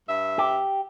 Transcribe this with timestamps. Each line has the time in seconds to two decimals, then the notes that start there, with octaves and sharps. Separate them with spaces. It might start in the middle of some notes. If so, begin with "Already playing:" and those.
0.09 G2 E5
0.38 G4